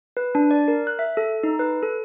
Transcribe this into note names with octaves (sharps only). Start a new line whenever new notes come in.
B4
D4
D5
A#4
F#6
E5
A4
D#4
B4
A4